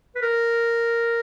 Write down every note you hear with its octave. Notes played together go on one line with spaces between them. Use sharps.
B4
A#4